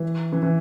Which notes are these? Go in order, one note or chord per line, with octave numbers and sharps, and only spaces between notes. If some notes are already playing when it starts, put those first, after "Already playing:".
Already playing: E3
E3
E3